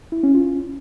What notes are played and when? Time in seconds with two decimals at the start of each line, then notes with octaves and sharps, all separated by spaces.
0.12 E4
0.23 C#4
0.35 F4